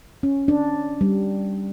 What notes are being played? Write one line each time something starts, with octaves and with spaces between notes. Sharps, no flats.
C#4
D4
G3